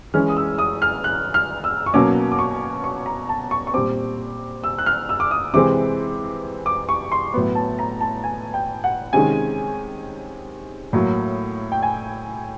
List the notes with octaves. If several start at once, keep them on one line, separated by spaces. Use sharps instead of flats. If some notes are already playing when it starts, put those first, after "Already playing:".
E3 G#3 C#4 F6
D#6
E6
D#6
F6
F#6
F6
E6
C#6
B2 F#3 A#3 C#4 D6
D6
C#6
C#6
A#5
A5
C#6
C#6
A#2 G3 C4 D6
E6
F#6
F6
E6
D6
D#6
C3 E3 G#3 C4 D6
D6
C#6
C6
A2 F#3 B3
A5
A#5
A5
G#5
G5
F#5
C3 D#3 G#3 C#4 G#5
A2 F#3 A#3
G5
G#5